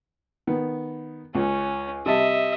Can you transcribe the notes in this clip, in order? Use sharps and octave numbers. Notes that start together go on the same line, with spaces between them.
D#3 B3
C#2 C#4
C3 G3 D#5 E5 A5